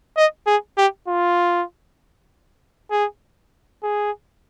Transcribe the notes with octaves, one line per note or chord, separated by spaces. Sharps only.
D#5
G#4
G4
F4
G#4
G#4